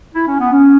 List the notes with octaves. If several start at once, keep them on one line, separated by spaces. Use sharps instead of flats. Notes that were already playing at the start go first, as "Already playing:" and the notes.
E4
C#4
B3
C#4